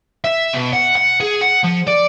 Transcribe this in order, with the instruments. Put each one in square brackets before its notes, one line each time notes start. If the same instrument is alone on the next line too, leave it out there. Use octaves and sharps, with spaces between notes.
[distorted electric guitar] E5
B2
F#5
F#5
G#4
F#5
F3
D5